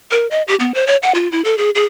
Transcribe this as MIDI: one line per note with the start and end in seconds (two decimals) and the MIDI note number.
0.11 0.27 70
0.31 0.42 75
0.48 0.55 67
0.60 0.72 59
0.74 0.87 72
0.87 0.97 73
1.03 1.12 78
1.15 1.30 65
1.32 1.42 64
1.45 1.57 69
1.58 1.70 68
1.75 1.85 68